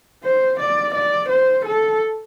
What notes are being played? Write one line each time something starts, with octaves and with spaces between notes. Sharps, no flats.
C5
D5
D5
C5
A4